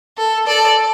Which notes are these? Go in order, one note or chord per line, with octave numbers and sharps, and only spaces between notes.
A4
A4 D5